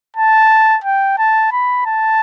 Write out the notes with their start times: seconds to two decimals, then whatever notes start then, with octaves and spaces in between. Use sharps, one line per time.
0.17 A5
0.84 G5
1.18 A5
1.52 B5
1.86 A5